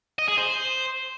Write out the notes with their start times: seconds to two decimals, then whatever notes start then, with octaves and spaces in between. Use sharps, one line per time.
0.19 D#5
0.28 G#4
0.38 C5